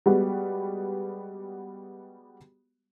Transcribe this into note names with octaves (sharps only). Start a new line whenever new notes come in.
G3 G#3 B3 F#4 G4